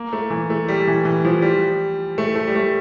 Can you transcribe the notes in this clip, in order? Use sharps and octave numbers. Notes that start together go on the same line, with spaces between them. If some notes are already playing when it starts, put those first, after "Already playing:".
Already playing: A#3
A3
E3
A3
G3
E3
E3
F3
G3
A3
A3
G3
A3